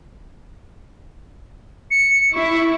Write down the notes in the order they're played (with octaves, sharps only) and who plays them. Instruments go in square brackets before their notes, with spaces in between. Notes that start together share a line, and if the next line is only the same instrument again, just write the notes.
[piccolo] C#7
[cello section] E4 [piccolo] C#6